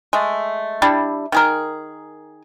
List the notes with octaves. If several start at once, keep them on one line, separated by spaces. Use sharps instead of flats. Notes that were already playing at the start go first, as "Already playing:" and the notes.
G#3 A3
G3 D4 E4
D#3 G#4 A#4